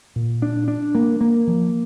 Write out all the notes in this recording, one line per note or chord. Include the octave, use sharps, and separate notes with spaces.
A#2
D4
D4
A#3
A#3
F3